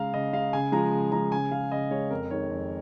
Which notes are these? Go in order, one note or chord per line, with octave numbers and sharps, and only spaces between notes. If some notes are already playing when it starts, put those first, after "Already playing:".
Already playing: C#3 G#3 F5 A#5
C#3 D#5
G#3 F5
C#3 G#5
F3 G#3 A#5
C#3
F3 G#3 A#5
C#3 G#5
G#3 F5
C#3 D#5
G#3 C#5
F2 A#4
D#3 G#3 C#5
F2